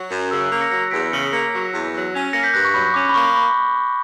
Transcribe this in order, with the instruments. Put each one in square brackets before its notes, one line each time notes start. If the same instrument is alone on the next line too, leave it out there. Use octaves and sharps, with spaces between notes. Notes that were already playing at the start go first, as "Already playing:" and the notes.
Already playing: [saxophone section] F#3
F#2
[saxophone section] C#3 [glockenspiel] E6
[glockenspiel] F#6
[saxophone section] A#3
[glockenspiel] A#6 C#7
[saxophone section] F#3 [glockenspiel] A#6 C#7
[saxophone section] E2 [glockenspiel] B6 D7
[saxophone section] C#3 [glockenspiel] C#7
[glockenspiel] B6
[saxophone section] A#3 [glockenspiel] A#6 C#7
[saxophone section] F#3
E2
F#3
C#4
[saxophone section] A#3 [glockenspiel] A#6 C#7
[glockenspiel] G6 B6
[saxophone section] G2 [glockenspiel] F#6 A#6
[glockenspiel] C#6
[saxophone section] F#3 [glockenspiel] B5
[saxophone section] C#4 [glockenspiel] D6
[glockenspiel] B5
[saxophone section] A#3 [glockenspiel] C#6
[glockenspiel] B5